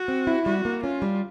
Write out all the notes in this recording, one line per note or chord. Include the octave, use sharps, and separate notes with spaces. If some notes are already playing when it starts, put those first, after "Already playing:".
Already playing: F#4
C4
E4
G3 F#4
A#3
C#4 F4
G3